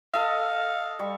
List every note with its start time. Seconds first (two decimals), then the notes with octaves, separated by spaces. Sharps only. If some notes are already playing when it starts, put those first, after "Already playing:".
0.14 A4 D#5 F5
0.99 G3 C#6